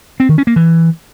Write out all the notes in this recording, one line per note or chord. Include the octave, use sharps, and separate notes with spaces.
C4
D#3
C#4
A#3
E3